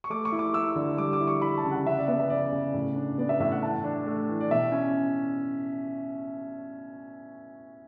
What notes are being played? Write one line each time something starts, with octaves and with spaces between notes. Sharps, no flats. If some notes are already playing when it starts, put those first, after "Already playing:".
C#6
A3 D6
C#6
E4
D6
E4 E6
D3
G3 D6
D6
E4
C#6
E4 B5
A5
C#3
F#5
C#3 E5
D5
B3 E5
E5
C#3 D5
C#3
A2
D4
B3 D5
E5
A2 E5
F#5
E3 A5
D4
A3
E3
D5
B2 E5
C#4